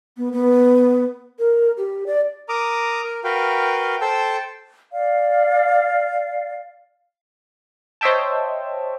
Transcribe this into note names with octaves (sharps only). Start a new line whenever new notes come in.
B3
B3
A#4
G4
D5
A#4 A#5 D6 D#6
A#4
F#4 A#4 B4 F5 G5
A4 C5 G5 A5 E6
D5 F5
C5 C#5 D#5 E5 G5 A5